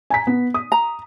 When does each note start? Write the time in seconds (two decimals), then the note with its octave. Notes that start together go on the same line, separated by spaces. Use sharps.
0.10 G#5 A#5 B6
0.27 B3
0.54 D#6
0.72 A#5